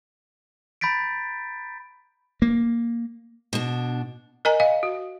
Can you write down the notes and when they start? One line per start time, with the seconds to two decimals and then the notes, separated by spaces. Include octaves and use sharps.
0.81 A#5 B5 G6 A6 B6 D7
2.42 A#3
3.53 B2 D4
4.45 A#4 D#5 G#5 A#5
4.60 D#5 F5 G#5
4.83 F#4